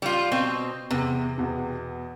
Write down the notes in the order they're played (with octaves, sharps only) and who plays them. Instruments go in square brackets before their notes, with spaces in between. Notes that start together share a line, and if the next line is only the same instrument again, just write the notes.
[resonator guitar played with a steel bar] G3 F4
B2 C4
[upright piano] E2 [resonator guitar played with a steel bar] C3
[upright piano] E2 B2